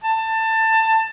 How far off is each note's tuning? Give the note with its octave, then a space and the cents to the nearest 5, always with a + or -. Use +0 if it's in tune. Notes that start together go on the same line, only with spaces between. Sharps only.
A5 +20